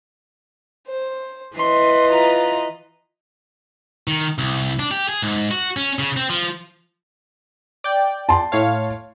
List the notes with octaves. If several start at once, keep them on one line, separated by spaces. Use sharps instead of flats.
C5
E3 B4 D#5 C6
F4 A#5
D#3
C2
D4
G4
G#4
G#2
F#4
C#4
C#3
C4
F3
D5 G5
A5 C6
A2 C#5 F5